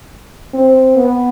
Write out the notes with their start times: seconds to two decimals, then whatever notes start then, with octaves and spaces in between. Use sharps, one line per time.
0.54 C4
0.96 B3